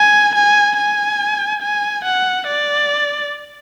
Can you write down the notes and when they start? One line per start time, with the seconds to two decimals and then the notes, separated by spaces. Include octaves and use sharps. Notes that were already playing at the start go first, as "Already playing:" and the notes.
Already playing: G#5
0.35 G#5
0.77 G#5
1.62 G#5
2.05 F#5
2.47 D5